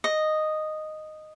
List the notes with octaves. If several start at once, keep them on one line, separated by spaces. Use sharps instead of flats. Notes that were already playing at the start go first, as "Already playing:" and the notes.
D#5